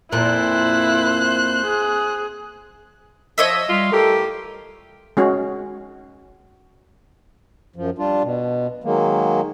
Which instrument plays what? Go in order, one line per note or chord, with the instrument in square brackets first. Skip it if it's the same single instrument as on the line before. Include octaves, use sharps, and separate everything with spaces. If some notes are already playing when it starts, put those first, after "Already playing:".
[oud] F2 A#2 [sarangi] E4 [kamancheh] C5 F#6
[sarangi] G#4
[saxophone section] F3 [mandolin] C#5 D#5 E5
[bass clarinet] G3 [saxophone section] F4
[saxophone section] A2 G4 A#4 [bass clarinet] A4
[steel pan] G#3 C#4 F#4
[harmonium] F#2 F3
G3 D4 F4
B2
D#3 F#3 G#3 A#3